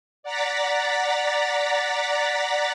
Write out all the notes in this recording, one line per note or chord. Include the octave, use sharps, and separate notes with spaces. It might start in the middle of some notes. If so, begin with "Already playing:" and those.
D5 F#5 A#5 A6 B6